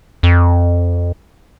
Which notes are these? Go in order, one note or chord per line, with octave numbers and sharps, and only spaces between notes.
F2